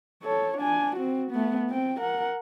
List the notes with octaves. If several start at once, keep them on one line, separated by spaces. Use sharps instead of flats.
A4 C#5
D4 G#5
C4 F#4
A3 B3
C4 G5
A#4 F#5